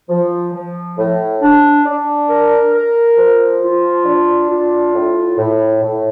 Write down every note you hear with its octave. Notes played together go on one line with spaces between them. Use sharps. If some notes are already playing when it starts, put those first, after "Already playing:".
F3
F3
A2
D4
D4
A#4
A#4
F3
F4
D4
F4
A2
A2
A2